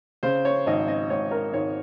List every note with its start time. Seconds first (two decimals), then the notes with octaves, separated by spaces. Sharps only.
0.23 C#3 C5
0.45 C#5
0.66 G#1 D#5
0.88 D#5
1.10 G#1 C#5
1.31 A#4
1.53 G#1 C#5